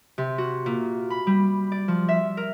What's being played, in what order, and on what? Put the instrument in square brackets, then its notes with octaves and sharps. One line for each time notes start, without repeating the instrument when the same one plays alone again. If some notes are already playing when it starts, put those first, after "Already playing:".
[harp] C3
F#4
A#2
B5
G3
D5
F3
E5
A#4